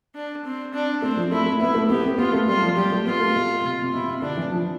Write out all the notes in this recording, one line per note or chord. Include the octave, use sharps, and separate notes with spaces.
D4
C4
D4
A3 C4
F3
A3 E4
A3
B3 E4
A3
B3 G4
C4
B3 F4
A3
G3 F4
F3
G3 G4
A3
B3 F4
A3
B2
C3
C3
B2 E4
C3
D3 D4
E3
F3